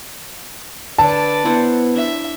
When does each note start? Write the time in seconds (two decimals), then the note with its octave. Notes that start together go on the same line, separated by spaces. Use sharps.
0.98 D3 A4 B4 D5 A5
1.45 B3 E4 C5 F#5
1.96 D4 E5